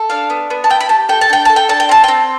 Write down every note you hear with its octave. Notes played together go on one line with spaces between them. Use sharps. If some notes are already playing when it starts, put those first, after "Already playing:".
Already playing: A4
D4 F5
B3
B3
A5
E4 G5
B5
G4 A5
A4 G5
A5
D4 G5
A4 A5
G5
D4 A5
G5
C4 A5
G5
C4